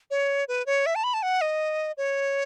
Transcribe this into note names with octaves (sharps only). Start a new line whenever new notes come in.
C#5
B4
C#5
E5
A5
B5
A5
F#5
D#5
C#5